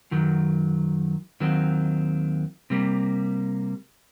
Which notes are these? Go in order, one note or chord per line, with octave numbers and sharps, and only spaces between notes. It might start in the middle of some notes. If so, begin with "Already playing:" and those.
F#2 D#3 F#3
D#2 D#3 F#3 C4
C3 G3 A#3